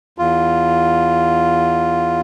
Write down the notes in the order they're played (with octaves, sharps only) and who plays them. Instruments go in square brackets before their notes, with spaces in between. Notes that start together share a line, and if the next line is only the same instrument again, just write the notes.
[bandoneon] E2 F4